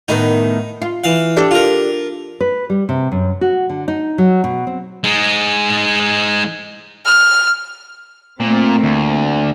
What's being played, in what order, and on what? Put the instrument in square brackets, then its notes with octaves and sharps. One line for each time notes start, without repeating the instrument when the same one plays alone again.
[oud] A2 D#3 B3 [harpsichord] D#4
[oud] F4
[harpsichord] E3 F5
[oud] D4 G4 A4
[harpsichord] F4 A#4
[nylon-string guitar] B4
G3
C3
F#2
F#4
D3
D#4
F#3
B2
C4
[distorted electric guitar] G#3 D#4
[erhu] F6
[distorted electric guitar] A#2 [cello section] A3 A#3 C4
[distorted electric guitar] D2